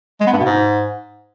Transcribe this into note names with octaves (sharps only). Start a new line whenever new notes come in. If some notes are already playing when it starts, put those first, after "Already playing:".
G#3
B3
G2
B2
G#2